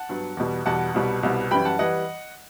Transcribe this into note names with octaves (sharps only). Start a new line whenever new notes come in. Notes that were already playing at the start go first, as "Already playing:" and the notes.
Already playing: F#5 A5
G2 F#3 B3
E2 B2 G3
E2 B2 G3 F#5 A5
C2 B2 G3 B3
C2 B2 G3 B3
F#2 E3 G3 G5 B5
F#5 A5
E3 G3 D#5 F#5